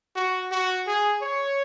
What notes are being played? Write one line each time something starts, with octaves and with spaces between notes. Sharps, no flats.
F#4
F#4
G#4
C#5